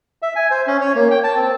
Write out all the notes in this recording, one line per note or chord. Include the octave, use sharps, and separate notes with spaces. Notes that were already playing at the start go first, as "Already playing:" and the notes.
E5
G#5
C5
C#4
C#5
A#3
G5
A5
C4